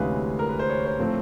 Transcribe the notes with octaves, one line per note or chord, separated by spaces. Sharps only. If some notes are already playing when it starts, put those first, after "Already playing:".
Already playing: D2 C3 E3 G#3 C#4 B4 F5
A#4
B4
C5
C#5
C5
A2 F3 A3 C4 C5